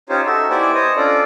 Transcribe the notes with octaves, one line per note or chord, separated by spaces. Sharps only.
C#4 D#4 F4 G4 C5 C#5
D#4 F#4 A4 E5
B3 E4 G4 C5 D5 G#5
C5 C#5 D#5 D#6
C#4 D4 F4 A4 D5